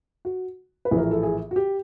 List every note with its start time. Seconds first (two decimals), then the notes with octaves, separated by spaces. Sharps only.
0.25 F#4
0.85 B4
0.91 A#1 A2 E3
0.98 A#4
1.11 A4
1.23 G#4
1.51 F#4
1.56 G4